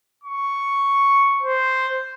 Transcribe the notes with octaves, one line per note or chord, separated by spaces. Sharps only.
C#6
C5